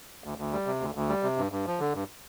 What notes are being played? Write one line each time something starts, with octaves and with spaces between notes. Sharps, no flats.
D2
D2
G3
C3
D2
D2
G3
C3
G2
G2
F3
D3
G2